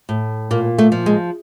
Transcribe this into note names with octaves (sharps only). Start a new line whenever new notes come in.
A2
A#2 A#3
A3
F3
G#3